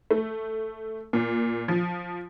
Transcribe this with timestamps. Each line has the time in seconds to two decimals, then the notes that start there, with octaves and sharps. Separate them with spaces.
0.11 A3
1.13 A#2
1.68 F3